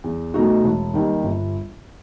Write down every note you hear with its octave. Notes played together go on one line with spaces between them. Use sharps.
E2
B2 A3 D#4 F#4
E1
D#2 D#3 G3
G1